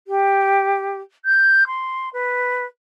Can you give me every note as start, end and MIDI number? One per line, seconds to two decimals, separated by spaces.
0.07 1.00 67
1.25 1.66 91
1.67 2.09 84
2.13 2.65 71